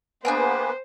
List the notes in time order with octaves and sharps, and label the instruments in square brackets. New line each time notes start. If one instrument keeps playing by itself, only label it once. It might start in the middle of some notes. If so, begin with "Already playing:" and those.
[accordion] A#3 B3 B4 [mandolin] D4 G#4 G5 [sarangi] C5